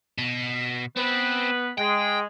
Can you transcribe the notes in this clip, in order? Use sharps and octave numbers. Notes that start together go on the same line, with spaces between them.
B2
B3 C4 B4
G#3 G5